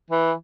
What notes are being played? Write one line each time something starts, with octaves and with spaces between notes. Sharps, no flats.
E3